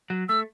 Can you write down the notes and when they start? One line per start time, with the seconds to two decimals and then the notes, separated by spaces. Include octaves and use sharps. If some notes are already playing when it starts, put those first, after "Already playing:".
0.10 F#3
0.29 A3 E6